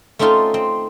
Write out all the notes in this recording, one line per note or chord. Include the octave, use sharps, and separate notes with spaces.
A3 C4 C#4 D#4 F4 A4
C4